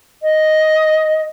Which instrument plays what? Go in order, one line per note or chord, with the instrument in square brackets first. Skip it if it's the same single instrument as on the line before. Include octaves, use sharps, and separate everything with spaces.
[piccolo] D#5